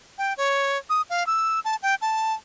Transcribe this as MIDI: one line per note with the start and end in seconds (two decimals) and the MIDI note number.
0.18 0.33 79
0.37 0.78 73
0.89 1.02 87
1.10 1.26 77
1.27 1.60 88
1.65 1.76 81
1.82 1.95 79
2.01 2.34 81